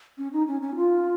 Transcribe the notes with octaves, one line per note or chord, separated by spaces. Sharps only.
C#4
D#4
C#4
C#4
F4